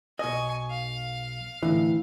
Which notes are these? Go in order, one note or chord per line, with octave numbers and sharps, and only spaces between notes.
B1 D#5 G#5 C#6
F5
D2 A2 E3